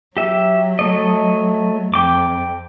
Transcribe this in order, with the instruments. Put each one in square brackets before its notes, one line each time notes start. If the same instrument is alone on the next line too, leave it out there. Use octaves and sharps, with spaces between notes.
[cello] F#3 [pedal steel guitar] G4 E5
[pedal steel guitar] A3 D#5
[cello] F2 [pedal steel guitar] G5 D6